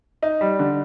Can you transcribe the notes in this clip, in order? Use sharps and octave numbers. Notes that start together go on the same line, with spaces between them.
D#4
G3
D3